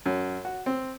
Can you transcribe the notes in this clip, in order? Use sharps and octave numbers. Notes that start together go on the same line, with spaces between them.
F#2
F#4
C4